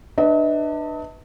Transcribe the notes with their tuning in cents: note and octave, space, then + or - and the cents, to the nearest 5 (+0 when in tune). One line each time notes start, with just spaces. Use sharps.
D4 +30 B4 +0 D#5 +45